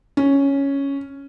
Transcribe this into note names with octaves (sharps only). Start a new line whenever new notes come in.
C#4